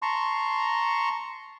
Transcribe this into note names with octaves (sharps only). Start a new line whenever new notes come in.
A5 A#5 C6 C#6